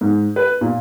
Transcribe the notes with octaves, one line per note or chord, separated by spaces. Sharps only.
G#2
B4
A#2